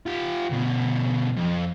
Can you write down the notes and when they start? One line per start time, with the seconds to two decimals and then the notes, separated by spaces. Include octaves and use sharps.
0.06 F4 G4
0.51 D2 B2
1.37 F2